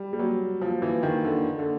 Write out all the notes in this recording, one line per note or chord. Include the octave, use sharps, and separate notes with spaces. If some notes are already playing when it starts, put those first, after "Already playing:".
Already playing: G3
G3
F#3
F3
E3
D#3
D3
D3